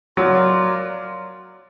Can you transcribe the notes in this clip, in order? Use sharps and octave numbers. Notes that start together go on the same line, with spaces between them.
F#3 F4 A#4 D5